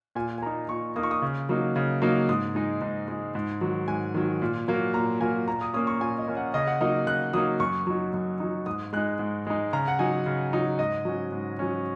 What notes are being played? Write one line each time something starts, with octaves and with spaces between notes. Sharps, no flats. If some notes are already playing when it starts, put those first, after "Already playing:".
A#2 G#5
G#5
A#3 D#4 A#5
A#2 C#6
A#3 D#4 D#6
C#6
D#6
C#3
F#3 A#3 D#4
C#3
F#3 A#3 D#4
G#2 D#6
G#3 D#4
G#2
G#3 D#4
G#2
D#3 F#3
G#2 G#5
D#3 F#3
A#2
F#3 A#3
A#2 A#5
F#3 A#3 G#5
A#2 A#5
D#6
A#3 C#4 D#6
C#6
A#2 G#5
D#5
A#3 C#4
F#5
C#3 D#5
F#5
F#3 A#3 D#4 D#5
C#3 F#6
F#3 A#3 D#4 D#6
F#2 C#6
F#3 D#4
F#2
F#3 D#4
G#2 D#6
G#3 D#4 F#6
G#2
G#3 D#4
C#3 A#5
F#5
F#3 D#4 G#5
C#3
F#3 D#4
G#2 D#5
F#3 C#4
G#2
F#3 C#4